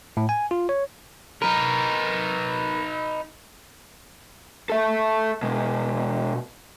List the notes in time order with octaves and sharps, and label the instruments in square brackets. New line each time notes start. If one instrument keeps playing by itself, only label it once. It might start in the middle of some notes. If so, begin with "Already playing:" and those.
[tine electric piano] A2
G#5
F4
C#5
[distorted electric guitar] D#4 B4 [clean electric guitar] A#4
[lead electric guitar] A4 E5
B2 G#3